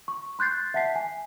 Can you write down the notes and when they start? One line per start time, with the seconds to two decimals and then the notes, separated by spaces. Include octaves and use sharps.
0.08 C#6
0.39 C6 F#6 G6 A6 C7
0.74 E5 F#5 A5 B6 C7
0.95 G#5